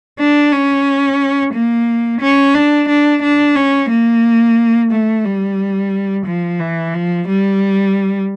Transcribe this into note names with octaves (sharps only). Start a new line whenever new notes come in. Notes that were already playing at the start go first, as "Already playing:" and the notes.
D4
C#4
A#3
C#4
D4
D4
D4
C#4
A#3
A3
G3
F3
E3
F3
G3